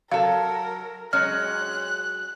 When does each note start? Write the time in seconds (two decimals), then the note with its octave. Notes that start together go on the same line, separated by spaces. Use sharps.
0.12 F#3 A4 A#4 F5
1.13 F#3 G#3 C#4 F6 F#6